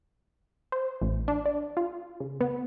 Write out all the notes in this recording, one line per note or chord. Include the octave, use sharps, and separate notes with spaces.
C5
A1
D4
D5
F4
C#3
B3